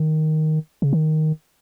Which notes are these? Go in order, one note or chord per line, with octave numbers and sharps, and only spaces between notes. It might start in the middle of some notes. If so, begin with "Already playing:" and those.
Already playing: D#3
C#3
D#3